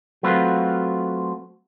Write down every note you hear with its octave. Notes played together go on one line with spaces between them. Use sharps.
F#3 A3 C4 F4 F#4 B4